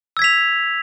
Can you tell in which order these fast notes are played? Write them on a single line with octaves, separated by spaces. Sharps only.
E6 G#6 B6 F7